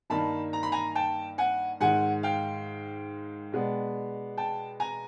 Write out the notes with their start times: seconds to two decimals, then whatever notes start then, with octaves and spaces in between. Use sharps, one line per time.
0.10 G2 D#3 G3 A#3 D#4 A5 B5
0.53 A#5
0.63 B5
0.72 G#5 A#5
0.95 G5 A5
1.38 F#5 G#5
1.80 G#2 D#3 G#3 F#5 G#5
2.23 F5 G5
3.52 B2 G#3 B3 D4
4.37 G5 A5
4.80 G#5 A#5